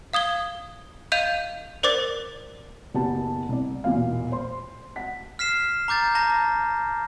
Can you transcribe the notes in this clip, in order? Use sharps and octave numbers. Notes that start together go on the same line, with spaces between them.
F5 D#6 G#6 G7
D#5 F5 G6 D#7 F7
A#4 C5 D5 D6 A6
F#1 B3 G4 A5
C2 D5
B1 E2 A#2 A#3 F5
C5 C6
F#5 B6
F6 B6 C7 E7
A#5 D6 G6 A6
A5 A#5 A#6